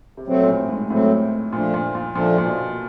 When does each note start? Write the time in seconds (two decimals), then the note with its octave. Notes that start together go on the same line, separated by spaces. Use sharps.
0.17 C3
0.27 B2 F#3 A3 C4
0.43 A#2
0.48 A2
0.69 G#2
0.90 A2 F#3 A3 C4
1.53 A#2 F3 A3 D4
1.74 A#2
1.95 A#2
2.15 A#2 F3 A3 D4
2.38 A#2
2.46 B2